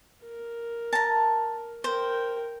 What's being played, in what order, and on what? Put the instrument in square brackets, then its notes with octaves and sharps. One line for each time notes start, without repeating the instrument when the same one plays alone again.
[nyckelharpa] A#4
[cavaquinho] A5 A#5
[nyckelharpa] A#4 G5 [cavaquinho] C5